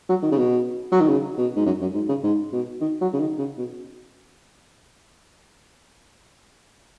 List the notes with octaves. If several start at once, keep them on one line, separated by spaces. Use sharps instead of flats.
F#3
D#3
C#3
B2
F#3
D#3
C#3
B2
G#2
F#2
F#2
G#2
C#3
G#2
B2
D#3
F#3
C#3
D#3
C#3
B2